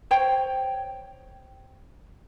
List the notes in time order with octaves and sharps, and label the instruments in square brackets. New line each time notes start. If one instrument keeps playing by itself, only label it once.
[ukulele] C5 C#5 G5